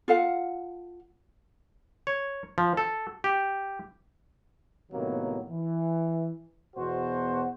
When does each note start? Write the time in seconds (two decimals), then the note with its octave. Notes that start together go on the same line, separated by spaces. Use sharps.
0.08 F4 A4 F5 F#5
2.07 C#5
2.58 F3
2.77 A4
3.24 G4
4.92 A2 C3 D#3 F#3 A#3 B3
5.50 E3
6.76 E2 B2 F#4 C5